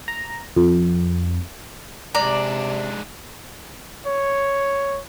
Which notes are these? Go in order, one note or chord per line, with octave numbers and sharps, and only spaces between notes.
A#5
F2
G#2 C3 D4 D5 A#5
C#5